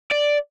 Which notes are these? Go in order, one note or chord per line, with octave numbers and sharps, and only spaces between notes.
D5